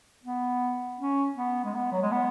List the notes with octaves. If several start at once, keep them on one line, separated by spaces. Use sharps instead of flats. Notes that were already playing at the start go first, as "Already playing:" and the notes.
B3
C#4
B3
G#3
B3
F#3
G#3
B3